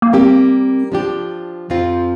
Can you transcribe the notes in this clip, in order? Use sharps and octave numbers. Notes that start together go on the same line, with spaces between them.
A#3
G3 A#3 C4 G4 A#4
F3 D4 G4
F2 F3 C4 F4